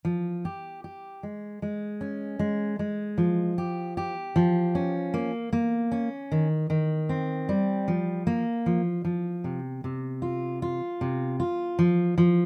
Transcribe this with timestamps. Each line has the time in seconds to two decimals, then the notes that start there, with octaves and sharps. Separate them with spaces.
0.05 F3
0.45 G4
0.84 G4
1.23 G#3
1.62 G#3
2.01 C#4
2.39 G#3
2.79 G#3
3.18 F3
3.58 G4
3.97 G4
4.36 F3
4.75 C#4
5.14 A#3
5.53 A#3
5.92 C#4
6.32 D#3
6.70 D#3
7.09 C4
7.49 G3
7.88 F3
8.27 A#3
8.66 F3
9.05 F3
9.44 C3
9.84 C3
10.22 F4
10.62 F4
11.01 C3
11.40 F4
11.79 F3
12.18 F3